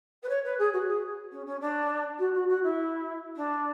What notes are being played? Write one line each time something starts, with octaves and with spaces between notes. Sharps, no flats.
B4
C#5
B4
G#4
F#4
G#4
C#4
C#4
D4
F#4
F#4
F#4
E4
D4